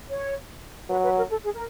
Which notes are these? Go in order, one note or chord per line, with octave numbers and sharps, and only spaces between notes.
C#5
F#3 B4
B4
A#4
A4
G#4
A#4